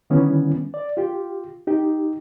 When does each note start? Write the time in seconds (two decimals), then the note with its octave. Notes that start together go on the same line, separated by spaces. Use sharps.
0.10 D3 D#3 G3 B3 C#4 E4
0.74 D5
0.97 F4 G4
1.67 D#4 G4